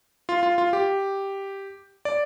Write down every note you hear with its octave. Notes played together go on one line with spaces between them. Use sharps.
F4
F4
F4
G4
D5